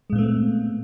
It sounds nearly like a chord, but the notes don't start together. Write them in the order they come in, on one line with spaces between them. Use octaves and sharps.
G#3 A#2 B3 A3 C4